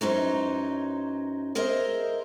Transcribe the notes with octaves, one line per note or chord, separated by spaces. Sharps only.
F#2 E3 F#3 C#4 D#4 C5
G#4 A#4 C5 D#5 E5